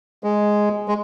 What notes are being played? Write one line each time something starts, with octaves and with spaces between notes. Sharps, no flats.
G#3
G#3